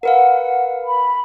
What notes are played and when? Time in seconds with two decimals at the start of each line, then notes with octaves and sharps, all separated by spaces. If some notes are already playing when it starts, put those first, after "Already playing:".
0.03 A#4 B4 F5 F#5
0.85 B5